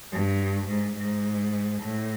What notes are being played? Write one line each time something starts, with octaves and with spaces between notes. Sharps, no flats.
G2
G#2
G#2
A2